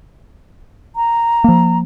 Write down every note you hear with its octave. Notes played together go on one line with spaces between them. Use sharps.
A#5
F3 A#3